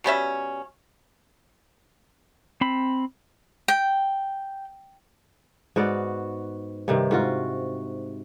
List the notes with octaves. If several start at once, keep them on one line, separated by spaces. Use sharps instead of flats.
B2 G3 C#4 E5
C4 B5
G5
G#2 B3 F#4 D5
G2 C3 D#3
G#2 F4 F#4